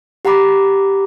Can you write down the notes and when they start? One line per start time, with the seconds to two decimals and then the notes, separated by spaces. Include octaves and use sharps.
0.25 G4 F#5 A#5 B5 D6